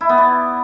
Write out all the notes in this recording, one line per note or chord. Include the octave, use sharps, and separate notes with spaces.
E4
B3
D5